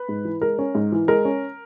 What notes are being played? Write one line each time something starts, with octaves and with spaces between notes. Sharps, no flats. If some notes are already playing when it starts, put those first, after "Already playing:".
Already playing: B4
G#2
E3
G#3 A#4
C#4
G#2
E3
G#3 A#4
C#4